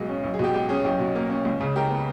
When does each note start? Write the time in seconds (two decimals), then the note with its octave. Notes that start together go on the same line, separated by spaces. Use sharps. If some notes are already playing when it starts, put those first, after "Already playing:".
Already playing: B1 B2 G#3
0.09 C#4
0.24 B1
0.34 G#4
0.39 B2 G4
0.54 G#3 G4
0.69 C#4 G#4
0.84 B1 G4
0.99 B2
1.15 A#3
1.30 C#4
1.45 C#2
1.61 C#3
1.76 G#3 G4 A#4
1.91 B3